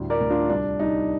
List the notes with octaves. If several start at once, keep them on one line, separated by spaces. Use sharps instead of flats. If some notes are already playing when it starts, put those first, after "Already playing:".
Already playing: D2 A2 G3
A#4 D5
D2
D4 F4
C2 D4
C2 D#4